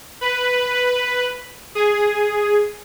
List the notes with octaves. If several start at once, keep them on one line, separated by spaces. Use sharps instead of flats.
B4
G#4